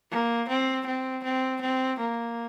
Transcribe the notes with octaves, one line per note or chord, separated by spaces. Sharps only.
A#3
C4
C4
C4
C4
A#3